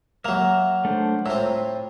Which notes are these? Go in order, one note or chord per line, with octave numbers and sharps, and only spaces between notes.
F#3 A#3 E5 A#5
A3 D4 C5
A2 C4 F4 A#5 E6